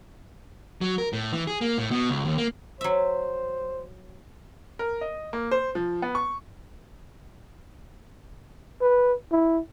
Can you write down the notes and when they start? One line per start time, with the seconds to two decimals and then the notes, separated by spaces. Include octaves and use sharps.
0.81 F#3
0.98 A#4
1.13 A2
1.33 E3
1.47 G#4
1.61 A#3
1.78 A2
1.91 B2
2.10 C#2
2.25 D#2
2.38 A#3
2.81 F#3 C5 E5
4.79 A#4
5.01 D#5
5.33 A#3
5.51 C5
5.75 F3
6.02 B3
6.15 C#6
8.81 B4
9.32 E4